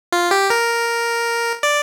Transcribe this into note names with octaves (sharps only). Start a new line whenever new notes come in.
F4
G4
A#4
D5